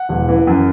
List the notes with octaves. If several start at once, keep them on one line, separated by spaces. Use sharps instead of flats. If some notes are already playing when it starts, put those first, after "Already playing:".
Already playing: F#5
E1
E3
F#2